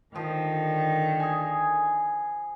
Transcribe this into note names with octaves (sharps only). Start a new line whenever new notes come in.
D3 D#3 F3 G5
G#4 G#5